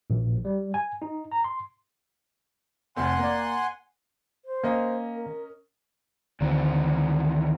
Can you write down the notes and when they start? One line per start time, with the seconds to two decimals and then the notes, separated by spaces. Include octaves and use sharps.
0.10 A#1
0.45 G3
0.74 G#5
1.02 D#4
1.32 A#5
1.44 C6
2.96 F1 A3 C4 F#5 G#5 C6
3.18 A#3 D5
4.45 C5
4.64 A#3 C#4 D#5
5.16 A#4
6.41 D2 D#3 E3 C4